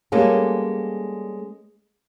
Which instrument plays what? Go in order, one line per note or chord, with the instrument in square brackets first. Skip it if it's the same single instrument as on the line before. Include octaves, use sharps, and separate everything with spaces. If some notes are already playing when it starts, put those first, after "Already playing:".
[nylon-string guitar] G3 G#3 A#3 B3 C#4 A4